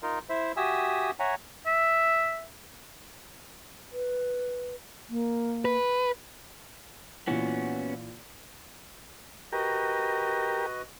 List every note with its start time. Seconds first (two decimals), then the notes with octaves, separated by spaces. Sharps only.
0.03 D#4 F4 A#4
0.29 E4 C5 E5
0.57 F#4 G4 E5 G#5 D#6 E6
1.19 C#5 E5 F#5 G#5 A#5
1.66 E5
3.92 B4
5.10 A#3
5.65 B4
7.27 A#2 E3 B3 C#4 F#4
9.53 F#4 G4 A#4 B4 D#5